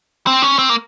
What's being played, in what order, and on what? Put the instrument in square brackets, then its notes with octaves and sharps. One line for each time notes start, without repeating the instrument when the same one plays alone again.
[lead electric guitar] C4
C#4
C4
A#3